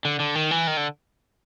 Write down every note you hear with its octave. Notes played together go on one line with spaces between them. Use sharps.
D3
D3
D#3
E3
D#3
D3